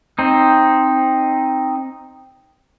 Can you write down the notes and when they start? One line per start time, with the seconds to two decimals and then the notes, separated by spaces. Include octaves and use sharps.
0.19 C4 D#4